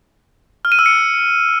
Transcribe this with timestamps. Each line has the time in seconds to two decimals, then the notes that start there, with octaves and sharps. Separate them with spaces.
0.65 F6
0.72 D#7
0.79 E6
0.86 C#7